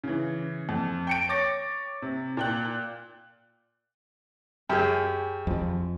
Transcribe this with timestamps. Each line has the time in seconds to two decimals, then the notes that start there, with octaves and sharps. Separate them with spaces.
0.04 C#3 E3
0.69 F2
1.07 G5 C#7 D7
1.29 C#5 D6 A6 A#6
2.02 C3
2.37 A#2 G5 F#6
4.69 F#2 G4 G#4
5.47 F2 F3